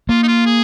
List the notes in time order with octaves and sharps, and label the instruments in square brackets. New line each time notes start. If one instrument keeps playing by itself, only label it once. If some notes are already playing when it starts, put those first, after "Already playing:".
[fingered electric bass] A#3 [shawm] F4
[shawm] D#4
F4
G#4